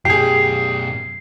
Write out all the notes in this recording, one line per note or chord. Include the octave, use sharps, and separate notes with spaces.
F#2 B2 G4 G#4 C7